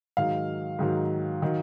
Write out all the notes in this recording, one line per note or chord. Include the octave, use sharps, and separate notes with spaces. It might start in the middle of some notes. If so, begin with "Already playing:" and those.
G#2 D#3 F#3 F5
G#2 D#3 F#3
D#3 F#3